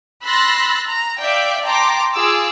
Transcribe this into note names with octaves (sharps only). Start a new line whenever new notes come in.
B5 C6 E6 F#6 A6 A#6
A#5
D5 E5 F5 G5 D6 G6
G5 A5 A#5 C6 D6
F4 G#4 D6 E6